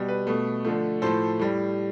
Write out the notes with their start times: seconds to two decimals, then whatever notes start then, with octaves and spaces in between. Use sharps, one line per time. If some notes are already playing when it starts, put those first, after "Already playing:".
Already playing: B2 G3
0.08 B4
0.27 B2 A3
0.64 D3 F3 A3
1.02 A2 F3 A3 A4 C5
1.39 A2 G3